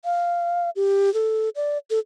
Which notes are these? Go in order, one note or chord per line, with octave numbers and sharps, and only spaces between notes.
F5
G4
A4
D5
A4